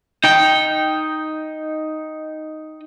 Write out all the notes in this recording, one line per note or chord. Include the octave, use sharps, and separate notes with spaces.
D#4 G5